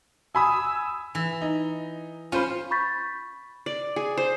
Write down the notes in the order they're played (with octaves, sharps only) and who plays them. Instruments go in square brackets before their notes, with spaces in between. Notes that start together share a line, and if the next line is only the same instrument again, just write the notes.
[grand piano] G#5 B5 D#6 [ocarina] E6
[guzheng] E3
[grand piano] D#4
[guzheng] C#4 [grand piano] F4 C5 B5
[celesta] B5 C#6 G6 A6 B6
[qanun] D5
G#4
C5